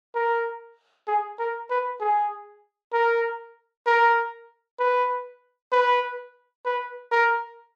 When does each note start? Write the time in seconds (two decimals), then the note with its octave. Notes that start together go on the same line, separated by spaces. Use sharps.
0.15 A#4
1.07 G#4
1.39 A#4
1.70 B4
2.00 G#4
2.93 A#4
3.86 A#4
4.79 B4
5.72 B4
6.65 B4
7.11 A#4